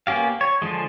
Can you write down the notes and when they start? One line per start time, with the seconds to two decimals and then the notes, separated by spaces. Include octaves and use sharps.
0.07 A#3 B3 C#4 G4 F5
0.41 C#5
0.62 D3 F3 G#3